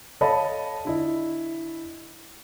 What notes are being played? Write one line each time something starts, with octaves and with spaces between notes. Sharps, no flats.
A4 C#5 D#5 F5 A5 B5
D3 E4 D#5